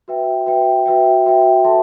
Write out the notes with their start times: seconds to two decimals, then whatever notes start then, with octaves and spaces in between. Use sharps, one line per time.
0.08 F#4 B4 E5 G5
0.46 F#4 B4 E5 G5
0.86 F#4 B4 E5 G5
1.26 F#4 B4 E5 G5
1.64 F#4 A4 E5 A5 C6